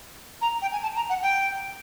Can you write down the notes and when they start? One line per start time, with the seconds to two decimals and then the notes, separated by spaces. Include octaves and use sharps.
0.42 A#5
0.62 G5
0.72 G#5
0.83 A5
0.96 A#5
1.09 F#5
1.23 G5